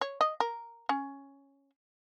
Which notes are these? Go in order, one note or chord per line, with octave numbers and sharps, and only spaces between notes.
C#5
D#5
A#4
C#4